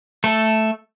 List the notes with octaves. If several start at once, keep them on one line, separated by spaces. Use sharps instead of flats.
A3 A4